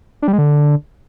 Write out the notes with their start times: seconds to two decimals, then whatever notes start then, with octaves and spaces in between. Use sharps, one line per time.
0.22 D4
0.28 G3
0.33 G#3
0.38 D3